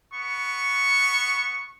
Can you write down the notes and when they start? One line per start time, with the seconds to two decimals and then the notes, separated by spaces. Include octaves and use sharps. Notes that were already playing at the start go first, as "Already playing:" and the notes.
0.14 B3 C#6